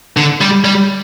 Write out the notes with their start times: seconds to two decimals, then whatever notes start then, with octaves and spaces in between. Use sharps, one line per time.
0.17 D3
0.41 G3
0.64 G3